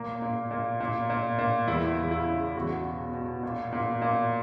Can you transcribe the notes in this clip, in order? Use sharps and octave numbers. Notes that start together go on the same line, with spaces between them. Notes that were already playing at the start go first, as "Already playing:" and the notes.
Already playing: A#2 A#3
A#2
A#2
A#2
A#2
A#2
E2 E4
E2
E4
C#3
E2 F#4
B2
B2
A#2
A#2
A#2